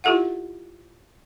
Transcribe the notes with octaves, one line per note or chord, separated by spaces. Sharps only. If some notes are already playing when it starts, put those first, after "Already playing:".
E4 F4 G4 A4 E5 F#5